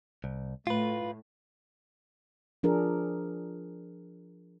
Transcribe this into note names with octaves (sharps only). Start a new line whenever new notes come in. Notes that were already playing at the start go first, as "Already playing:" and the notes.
C2
A2 F4 B4
F3 D4 G#4 A#4